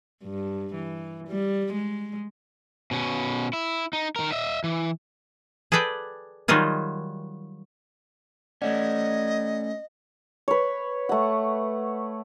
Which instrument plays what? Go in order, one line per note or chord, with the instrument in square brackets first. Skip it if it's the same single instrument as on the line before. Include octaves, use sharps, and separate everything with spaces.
[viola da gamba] G2
E3
G3
G#3
[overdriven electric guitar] B2 C#4
E4
D#4
D#3 A#4
D#5 E5
E3
[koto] G#4 A4 B4 D5 G5
D#3 F#3 G3 D#4 F4 G#4
[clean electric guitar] A3 C#4 [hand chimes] D5 F#5 [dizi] D#5
[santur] B4 C#5
A3 F#5